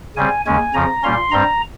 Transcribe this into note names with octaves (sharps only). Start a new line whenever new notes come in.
C#3 G3 C4 G#5
D#2 C#3 G#3 C#4 G#5
F2 C#3 F3 A#5
A#2 G3 A#3 C#4 C6
G2 G3 C4 A#5